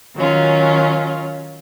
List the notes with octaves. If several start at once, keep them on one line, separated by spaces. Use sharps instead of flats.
D#3 F#3 C#4 F4